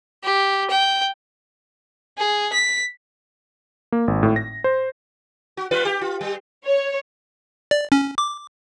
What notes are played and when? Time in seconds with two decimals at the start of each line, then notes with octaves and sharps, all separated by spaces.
0.24 G4
0.70 G5
2.18 G#4
2.53 B6
3.92 A#3
4.08 G#1
4.23 A2
4.36 A#6
4.64 C5
5.57 F#4
5.71 G3 F4 B4
5.85 G4
6.01 F4
6.21 G3
6.66 C#5
7.71 D5
7.92 C#4
8.18 D6